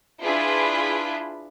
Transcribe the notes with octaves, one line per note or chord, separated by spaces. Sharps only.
D4 E4 F4 G#4 B4 B5